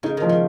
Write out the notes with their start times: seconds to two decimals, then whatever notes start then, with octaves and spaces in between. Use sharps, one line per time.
0.03 C#3 D#4
0.17 D#3 F3
0.29 C#3